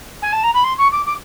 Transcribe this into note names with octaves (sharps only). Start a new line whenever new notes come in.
G#5
A5
A#5
B5
C6
C#6
D6
D6